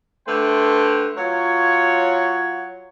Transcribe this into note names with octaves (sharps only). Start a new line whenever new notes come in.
D3 A3 B4 C5 G5
F#3 F4 C#5